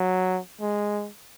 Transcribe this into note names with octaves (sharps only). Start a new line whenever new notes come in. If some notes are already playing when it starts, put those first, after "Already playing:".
Already playing: F#3
G#3